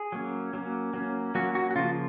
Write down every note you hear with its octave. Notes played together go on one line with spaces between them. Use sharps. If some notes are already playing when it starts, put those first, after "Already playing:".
Already playing: G#4
F#3 A#3 C#4
F#3 A#3 C#4
F#3 A#3 C#4
F#3 A#3 C#4 F#4
F#4
F#4
C#3 F3 A#3 F4